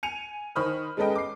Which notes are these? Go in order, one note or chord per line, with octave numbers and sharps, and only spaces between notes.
G#5 C#7 D#7 F7
D#3 C5 B5 C#6 D#6 F6
G#3 C#4 A4 B4 D#5 G5
D6 C7